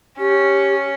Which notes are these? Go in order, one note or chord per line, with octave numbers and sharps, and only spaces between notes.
C#4 G4